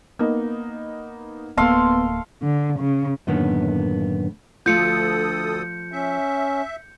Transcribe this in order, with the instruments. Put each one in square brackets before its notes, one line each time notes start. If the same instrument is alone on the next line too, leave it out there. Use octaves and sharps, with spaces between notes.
[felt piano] A#3 B3 D#4
[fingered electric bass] D1 A#3 [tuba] B3 [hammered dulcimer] A4 F5 C6
[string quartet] D3
C#3
[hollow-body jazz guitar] F#2 A2 D3 D#3 A#3 B3
[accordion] D2 A4 D#6 [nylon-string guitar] F3 A3 F4 [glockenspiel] G6 C#7
[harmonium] C#4 [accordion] E5